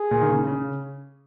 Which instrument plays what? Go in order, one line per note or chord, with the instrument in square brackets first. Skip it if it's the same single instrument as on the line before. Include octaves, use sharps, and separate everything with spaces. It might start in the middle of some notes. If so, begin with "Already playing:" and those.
Already playing: [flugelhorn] G#4
[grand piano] A#2
D#3
C#3
C#3